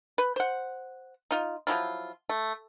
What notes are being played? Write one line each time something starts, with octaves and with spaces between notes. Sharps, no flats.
B4
C5 F#5
D#4 F4
F3 F#3 E4 F4
A3